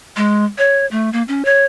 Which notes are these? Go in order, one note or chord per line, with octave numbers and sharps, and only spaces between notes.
G#3
C#5
A3
A#3
C#4
C#5